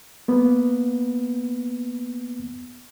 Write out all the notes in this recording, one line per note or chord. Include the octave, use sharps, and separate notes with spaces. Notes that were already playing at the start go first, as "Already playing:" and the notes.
A#3 B3